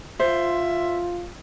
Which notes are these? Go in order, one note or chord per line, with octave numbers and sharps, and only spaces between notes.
F4 C5 E5